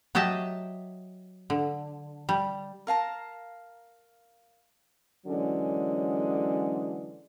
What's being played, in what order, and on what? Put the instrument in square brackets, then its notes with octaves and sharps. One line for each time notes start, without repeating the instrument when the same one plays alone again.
[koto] F#3 G4 D#5 E5 A5
D3
G3
[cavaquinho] A#4 F5 A5 A#5
[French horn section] D3 E3 F#3 G#3 C#4